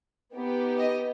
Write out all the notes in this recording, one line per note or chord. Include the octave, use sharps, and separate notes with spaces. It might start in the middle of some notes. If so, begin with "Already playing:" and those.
B3 D#4 G4
D#5